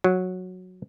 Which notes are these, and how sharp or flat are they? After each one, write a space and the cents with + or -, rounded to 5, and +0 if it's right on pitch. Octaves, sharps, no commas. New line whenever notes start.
F#3 -10